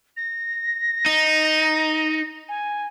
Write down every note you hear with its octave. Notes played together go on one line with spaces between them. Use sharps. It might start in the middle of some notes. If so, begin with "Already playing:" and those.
A#6
D#4
G#5